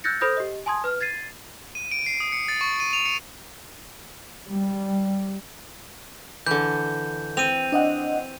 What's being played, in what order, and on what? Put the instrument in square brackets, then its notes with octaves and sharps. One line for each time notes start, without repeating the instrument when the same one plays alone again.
[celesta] E6 F#6 G6 A6 A#6 C#7
A4 C5 B5 D#6 G6 A#6
G4 D#5
G#5 A5 C6 D#6 G#6
B4 F6
G#6 A6 C7 D#7
[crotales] D#7
D7
C7
D#6
C#7
A6
C#6
D#7
F7
C#7
[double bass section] G3
[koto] D3 E3 [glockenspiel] G6
[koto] C4 [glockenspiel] D#7 F7
[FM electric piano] D4 D#5 F#5